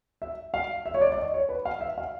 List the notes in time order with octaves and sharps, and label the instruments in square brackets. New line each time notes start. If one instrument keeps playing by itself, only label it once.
[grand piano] E5
F5
E5
C#5
D5
D5
D#5
C#5
B4
F5
E5
F5